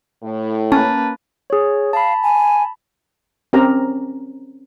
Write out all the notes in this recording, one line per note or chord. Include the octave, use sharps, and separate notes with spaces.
A2
A#3 C#4 B4 A5
G#4 C#5
F5 A5 B5
G#5
C4 C#4 G4 A#4 A#5